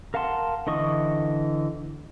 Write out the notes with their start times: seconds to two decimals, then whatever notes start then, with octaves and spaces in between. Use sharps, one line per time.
0.14 A#4 F5 F#5 A5 C6
0.67 D3 E3 D#5 C#6 D#6